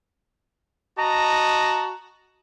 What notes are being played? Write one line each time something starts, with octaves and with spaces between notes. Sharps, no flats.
F#4 D#5 A5 A#5